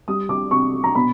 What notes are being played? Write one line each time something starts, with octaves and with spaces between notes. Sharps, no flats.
G3 D#6
D6
C3 C#6
A#5
B2 B5